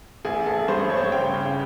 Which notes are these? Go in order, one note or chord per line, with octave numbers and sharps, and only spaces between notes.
A1 G#4
A1 A4
G2 C5
G2 C#5
C5
C#5
C#3 G5
C#3